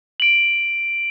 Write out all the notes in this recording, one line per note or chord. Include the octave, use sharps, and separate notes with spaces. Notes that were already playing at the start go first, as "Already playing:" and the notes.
D7 F#7